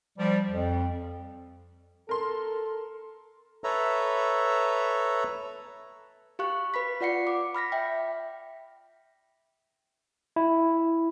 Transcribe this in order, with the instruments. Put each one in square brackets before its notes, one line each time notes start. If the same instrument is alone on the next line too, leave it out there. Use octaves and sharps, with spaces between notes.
[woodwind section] F3 G3
F2
[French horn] A4 [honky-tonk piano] A#4 C6
[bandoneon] A4 B4 C#5 E5 A#5
[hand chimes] G4 F5 C#6 F#6
B4 B5 B6
F4 D5 F#5 C7 C#7
D6
B5 F6 A#6 B6
E5 G5
[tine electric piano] E4